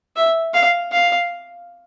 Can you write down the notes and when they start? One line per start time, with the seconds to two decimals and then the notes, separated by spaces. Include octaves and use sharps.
0.16 E5
0.54 F5
0.92 F5